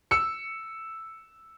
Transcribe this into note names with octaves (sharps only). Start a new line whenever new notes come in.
E6 C#7